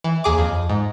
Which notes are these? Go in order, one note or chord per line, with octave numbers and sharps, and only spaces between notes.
E3
D#2 G#4 D6
F2
G#2